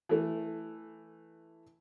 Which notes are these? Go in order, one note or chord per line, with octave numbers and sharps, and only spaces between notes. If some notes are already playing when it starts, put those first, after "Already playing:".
E3 A3